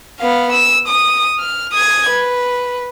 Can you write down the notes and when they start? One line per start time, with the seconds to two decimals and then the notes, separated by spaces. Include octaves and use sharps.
0.20 B3 F5
0.53 E6
0.88 D#6
1.39 F6
1.73 D#6 G#6
2.10 B4